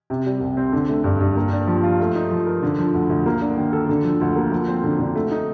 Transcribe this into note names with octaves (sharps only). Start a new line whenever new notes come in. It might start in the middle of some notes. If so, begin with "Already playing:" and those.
C3
G3
C2
C4
D3
A3
G2
G2
A#3
D4
F3
F4
A3
D#4
F3
A#4
D3
F3
D2
D2
A#3
D4
D#3
A4
D3
F3
D2
A#3
F3
C4
D3
D3
A3
D#4